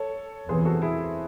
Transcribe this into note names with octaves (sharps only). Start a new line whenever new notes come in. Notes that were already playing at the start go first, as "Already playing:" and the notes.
Already playing: A4 C#5
E2 C3 E3 G#4 C5
F#4 A4
E4 G#4